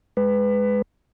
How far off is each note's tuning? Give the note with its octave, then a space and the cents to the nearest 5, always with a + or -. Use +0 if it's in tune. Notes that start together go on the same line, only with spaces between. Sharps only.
G#3 +0 B4 +15